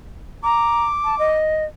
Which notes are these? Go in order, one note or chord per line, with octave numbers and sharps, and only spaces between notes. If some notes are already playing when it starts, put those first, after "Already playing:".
A#5 D6
A5
D#5